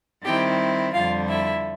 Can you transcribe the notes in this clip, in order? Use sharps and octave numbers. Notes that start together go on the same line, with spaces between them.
D#3 G3 C4 E4 G4 G5
F2 D3 G3 F4 F5
E4 E5